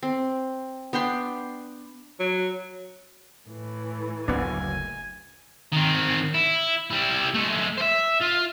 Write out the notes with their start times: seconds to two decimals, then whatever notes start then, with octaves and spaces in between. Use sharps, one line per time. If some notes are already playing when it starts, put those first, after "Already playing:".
0.03 C4
0.93 B3 D4 G5 C6
2.20 F#3
3.48 A2 E3
4.28 F#1 D2 B3 D4 G#5
5.72 D#3 C4
6.34 E4
6.90 G3 E4
7.34 G#3 A3
7.78 C5 E5
8.21 F4